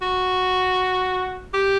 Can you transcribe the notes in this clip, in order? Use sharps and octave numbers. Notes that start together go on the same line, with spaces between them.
F#4
G4